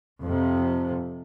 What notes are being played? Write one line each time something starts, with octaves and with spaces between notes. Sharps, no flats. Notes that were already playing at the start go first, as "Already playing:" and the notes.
F2 C3